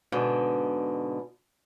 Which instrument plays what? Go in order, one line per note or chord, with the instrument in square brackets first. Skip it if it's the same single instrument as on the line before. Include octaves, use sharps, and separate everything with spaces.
[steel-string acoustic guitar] G#2 B2 D3